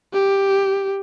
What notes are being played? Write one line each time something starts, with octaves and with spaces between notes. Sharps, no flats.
G4